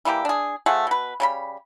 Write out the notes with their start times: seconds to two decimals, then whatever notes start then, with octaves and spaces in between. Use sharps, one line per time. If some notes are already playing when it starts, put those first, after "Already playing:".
0.05 E3 G3 A#3 G4
0.25 D4 G#4
0.66 F3 A3 G#4 F#5
0.87 B2 B4
1.20 C#3 G3 B5